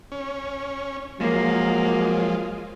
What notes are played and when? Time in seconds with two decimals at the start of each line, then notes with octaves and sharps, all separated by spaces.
0.12 C#4
1.20 F3 F#3 G#3 A#3